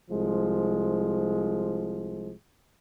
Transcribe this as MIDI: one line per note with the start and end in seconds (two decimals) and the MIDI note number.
0.10 2.32 36
0.10 2.32 53
0.10 2.32 56